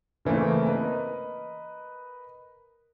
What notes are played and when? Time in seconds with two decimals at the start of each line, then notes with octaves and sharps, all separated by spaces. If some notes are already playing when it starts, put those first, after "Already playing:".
0.25 C#3 E3 A3 A#3 C4
0.67 A#4 B4 D#5